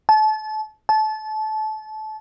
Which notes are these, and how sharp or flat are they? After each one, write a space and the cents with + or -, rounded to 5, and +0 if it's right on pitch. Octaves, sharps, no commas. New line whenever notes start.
A5 -30
A5 -25